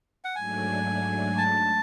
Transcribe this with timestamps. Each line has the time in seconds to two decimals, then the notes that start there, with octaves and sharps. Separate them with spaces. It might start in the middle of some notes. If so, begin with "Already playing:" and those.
0.24 F#5
0.36 G#2 F#3 A3 D4 G#5
1.38 A5